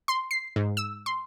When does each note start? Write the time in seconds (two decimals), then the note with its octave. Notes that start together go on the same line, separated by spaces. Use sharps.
0.08 C6
0.31 C7
0.56 G#2
0.77 E6
1.06 C6